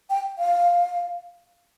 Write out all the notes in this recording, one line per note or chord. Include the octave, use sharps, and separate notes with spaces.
G5
F5